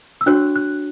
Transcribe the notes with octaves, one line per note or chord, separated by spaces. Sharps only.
E6
D4 F#4 C#5 F#6
F#6